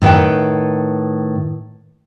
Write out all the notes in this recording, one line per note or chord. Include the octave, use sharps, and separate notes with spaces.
A2 D#3 B4 F#5 G5